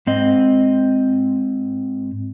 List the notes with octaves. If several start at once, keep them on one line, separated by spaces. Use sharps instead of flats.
G#2 C4 D#5